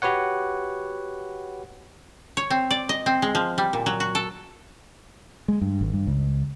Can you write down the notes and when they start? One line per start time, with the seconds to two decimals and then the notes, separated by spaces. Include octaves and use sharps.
0.02 F#4 G4 B4 C#5 F#5
2.37 C#5
2.50 C4
2.71 D5
2.89 D#5
3.06 C4
3.22 G#3
3.35 F3
3.58 G3
3.73 A#2
3.86 F#3
4.00 F#4
4.15 A4
5.48 G#3
5.61 G2
5.81 G#1
5.93 G2
6.07 C#2